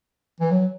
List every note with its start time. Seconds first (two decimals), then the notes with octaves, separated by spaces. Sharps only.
0.40 E3
0.51 F#3